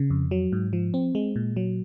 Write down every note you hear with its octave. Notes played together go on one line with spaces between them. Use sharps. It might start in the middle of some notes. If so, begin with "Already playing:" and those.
Already playing: C#3
F2
F#3
G#2
F3
C4
G#3
A#2
F#3